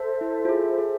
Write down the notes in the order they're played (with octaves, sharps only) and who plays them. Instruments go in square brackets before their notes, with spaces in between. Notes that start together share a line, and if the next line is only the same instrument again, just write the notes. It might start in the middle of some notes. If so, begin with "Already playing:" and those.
Already playing: [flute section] A4 C5 E5
[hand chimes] E4
F4
G#4
G#4